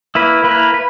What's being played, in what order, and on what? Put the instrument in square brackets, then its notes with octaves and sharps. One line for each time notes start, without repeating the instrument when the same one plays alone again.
[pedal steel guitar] A#3 E4 B4
A#3 E4 B4
B4